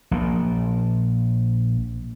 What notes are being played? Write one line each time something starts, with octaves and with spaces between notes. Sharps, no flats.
A#1 A#2